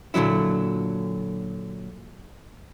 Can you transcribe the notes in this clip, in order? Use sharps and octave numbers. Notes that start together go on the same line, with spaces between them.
A#2 D3 D#3 F#3 E4